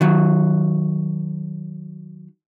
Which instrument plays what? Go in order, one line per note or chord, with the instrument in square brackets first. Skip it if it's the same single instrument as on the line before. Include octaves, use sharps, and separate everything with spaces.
[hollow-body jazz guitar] D#3 F#3